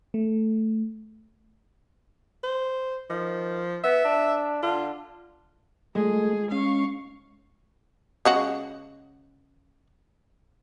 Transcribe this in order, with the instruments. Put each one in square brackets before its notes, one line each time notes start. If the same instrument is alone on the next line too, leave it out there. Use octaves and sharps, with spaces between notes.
[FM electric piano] A3
[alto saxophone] C5
[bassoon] D#3 [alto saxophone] F3
[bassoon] B3 [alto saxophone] E5
[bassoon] D4
[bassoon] D3 [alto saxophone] F4
[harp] G#3 [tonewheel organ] A3 [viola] F4 G#4
[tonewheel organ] C#4 [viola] F5 C#6
[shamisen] C#3 G#3 F#4